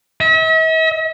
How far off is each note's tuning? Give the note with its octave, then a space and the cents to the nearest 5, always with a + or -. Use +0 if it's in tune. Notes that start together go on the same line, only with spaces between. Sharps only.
E5 -45